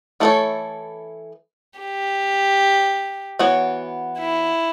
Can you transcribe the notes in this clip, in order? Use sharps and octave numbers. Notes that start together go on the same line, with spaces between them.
E3 A3 E4 A4 C#5
G4
E3 B3 F#4 C#5
E4